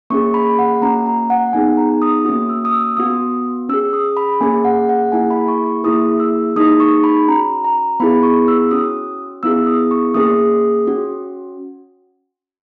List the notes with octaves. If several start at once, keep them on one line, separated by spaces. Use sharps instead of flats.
A#3 C#4 G#4 C#6
B5
F#5
A#3 C#4 F#4 A#5
A#5
F#5
B3 D#4 G#4 G#5
A#5
D#6
A#3 C#4 F#4 D#6
E6
D#6
E6
B3 F#4 D#6
C#4 G#4 E6
D#6
B5
A#3 C#4 G#4 G#5
F#5
F#5
A#3 E4 G#4 G#5
B5
C#6
C#6
A#3 E4 G#4 D#6
E6
A#3 D#4 G#4 D#6
C#6
B5
C#4 F#4 A#5
A#5
B3 E4 G#4 B5
C#6
E6
C#4 F#4 D#6
B3 E4 G#4 E6
D#6
C#6
A#3 C#4 G#4 D#6
C#4 F#4